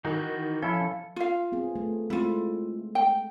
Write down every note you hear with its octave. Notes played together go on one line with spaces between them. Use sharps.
D#3 E3 D#4 F#4
F3 C#4 E4 A4
F4 F5
B3 C4 G#4
A3
G#3 A3 C4 E4 F4
G5